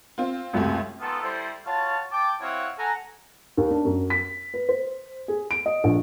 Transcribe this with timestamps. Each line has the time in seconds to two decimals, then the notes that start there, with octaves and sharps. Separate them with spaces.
0.18 C4 F4
0.53 C#2 F#2 C3 A3
1.01 D#3 G#3 B3 F4 A4
1.22 G3 E4 A4 C5
1.66 F4 F#4 C#5 F5 A5
2.11 G5 A5 D6
2.41 C4 E4 F#4 C#5 F5 F#5
2.78 A4 F#5 G#5 A#5
3.57 D#2
3.71 D4
3.85 F#2
4.10 B6
4.54 B4
4.69 C5
5.28 G#4
5.51 D7
5.66 D#5
5.84 A#1